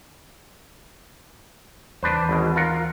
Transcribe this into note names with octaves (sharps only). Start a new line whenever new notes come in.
D#2 E3 D4 B4 C5
G#1 B2
F4 A#4 F#5